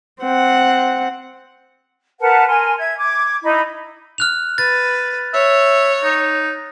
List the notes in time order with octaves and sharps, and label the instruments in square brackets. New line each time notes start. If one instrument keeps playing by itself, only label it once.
[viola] C4 F#5
[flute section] A#4 B4 F#5 A5
A#4 G#5 C6
E5 G#6
D6 G#6
D#4 E4 B5
[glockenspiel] F6 F#6 F7
[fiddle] B4 [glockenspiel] A6
[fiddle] C#5 [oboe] E5
[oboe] D#4